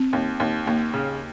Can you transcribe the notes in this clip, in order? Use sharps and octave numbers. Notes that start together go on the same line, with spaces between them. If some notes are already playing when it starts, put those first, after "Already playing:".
Already playing: C4
D#2
D#2
D#2 A#3
C#3